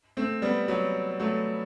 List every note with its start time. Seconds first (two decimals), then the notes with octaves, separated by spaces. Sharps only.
0.17 A3 C4
0.42 G3 B3
0.68 F#3
1.20 F#3 A3